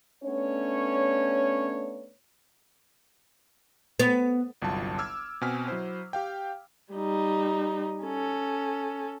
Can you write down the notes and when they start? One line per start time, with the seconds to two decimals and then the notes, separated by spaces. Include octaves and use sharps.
0.24 A3 B3 C#4 D4 C#5
3.99 B3
4.62 G1 C2 F#3 F4 A5
4.98 D6 E6 F6 G#6
5.41 B2 B3 C4 G#5 F6 B6
5.68 F#3 E4 C5
6.13 G4 F5 G5
6.93 G3 D#4
8.03 C#4 A4